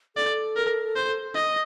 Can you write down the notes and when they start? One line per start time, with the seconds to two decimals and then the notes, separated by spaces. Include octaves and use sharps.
0.16 A4 D5
0.56 A#4
0.96 C5
1.35 D#5